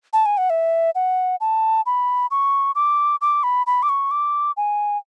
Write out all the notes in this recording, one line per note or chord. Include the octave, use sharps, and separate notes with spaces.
A5
G#5
F#5
E5
F#5
A5
B5
C#6
D6
D6
B5
B5
D6
C#6
D6
G#5